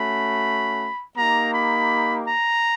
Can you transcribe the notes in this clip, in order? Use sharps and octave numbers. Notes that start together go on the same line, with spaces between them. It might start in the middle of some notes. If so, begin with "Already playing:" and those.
Already playing: A3 C#4 F#4 B5
A#3 D#4 G4 A#5
B5
A#5